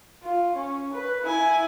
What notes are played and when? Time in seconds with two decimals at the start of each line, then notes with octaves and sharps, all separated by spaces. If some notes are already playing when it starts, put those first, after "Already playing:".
0.23 F4
0.55 C#4
0.93 B4
1.23 E4 G#5